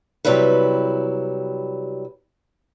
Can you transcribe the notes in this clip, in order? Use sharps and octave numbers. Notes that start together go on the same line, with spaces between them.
C3 F#3 G3 E4 B4